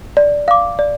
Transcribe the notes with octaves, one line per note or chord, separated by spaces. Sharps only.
D5
F5 D6
D5